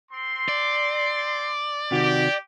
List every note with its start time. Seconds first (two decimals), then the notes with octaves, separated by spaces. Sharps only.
0.12 C4 C6
0.49 D5
1.91 C3 D#3 F#4 G4